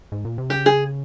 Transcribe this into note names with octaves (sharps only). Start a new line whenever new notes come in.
G#2
A#2
C3
C#3 G4
G#4